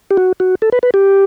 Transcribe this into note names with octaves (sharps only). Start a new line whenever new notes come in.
G4
F#4
F#4
A4
B4
B4
G4